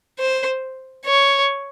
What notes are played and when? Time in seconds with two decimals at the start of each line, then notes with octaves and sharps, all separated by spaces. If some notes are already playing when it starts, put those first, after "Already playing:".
0.19 C5
1.06 C#5